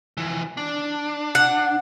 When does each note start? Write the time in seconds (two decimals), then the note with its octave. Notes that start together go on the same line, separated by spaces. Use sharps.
0.17 E3 F3
0.57 D4
1.35 F#5